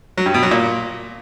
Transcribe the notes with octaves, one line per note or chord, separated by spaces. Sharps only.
F#3
G2
B2
F#3
A#2